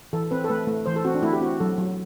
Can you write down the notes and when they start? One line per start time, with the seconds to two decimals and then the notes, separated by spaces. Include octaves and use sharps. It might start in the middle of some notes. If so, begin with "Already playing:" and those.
0.13 E3 A4
0.31 C4 B4
0.44 A4
0.49 A3 B4
0.67 A3
0.86 E3 C5
0.96 A4
1.05 C4 F#4
1.14 D4
1.23 A3 E4
1.33 G4
1.41 C4 F#4
1.60 F#3 A4
1.78 F#3